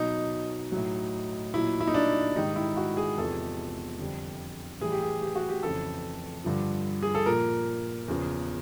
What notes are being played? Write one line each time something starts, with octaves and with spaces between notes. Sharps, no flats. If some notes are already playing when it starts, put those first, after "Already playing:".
Already playing: B2 F#3 D#4
A2 F#3
A#2 F#3 E4
E4
D#4
D4
G#2 D#3 G3 D#4
E4
F#4
G#4
E2 C3 F3 A4
F2 D3 G3
A2 E3 G3 G#4
G4
G#4
G4
F#4
G4
F2 C#3 E3 A4
G2 D3 F3
G#4
A4
A#2 F3 A#4
E2 C#3 F3